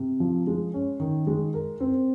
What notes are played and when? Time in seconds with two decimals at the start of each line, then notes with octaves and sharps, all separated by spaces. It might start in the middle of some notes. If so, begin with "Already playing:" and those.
Already playing: C3
0.20 F3
0.47 G#3
0.74 C#4
1.00 D#3
1.27 G#3
1.54 A#4
1.80 C4